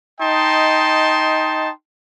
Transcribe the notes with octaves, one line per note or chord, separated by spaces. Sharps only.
D#4 D#5 G5 A5 C6